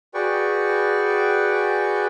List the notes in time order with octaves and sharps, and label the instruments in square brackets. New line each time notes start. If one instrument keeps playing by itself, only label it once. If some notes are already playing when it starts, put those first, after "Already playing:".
[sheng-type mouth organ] F#4 G#4 B4 D5 G5 C#6